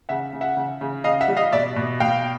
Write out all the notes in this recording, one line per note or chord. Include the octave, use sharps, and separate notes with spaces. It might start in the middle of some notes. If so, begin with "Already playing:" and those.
C#3 E5 F#5
C#3
E5 F#5
C#3
C#3
C#3 D#5 F5
E5 F#5
G3
D#5 F5
B2 D5 E5
B2
B2 F5 G5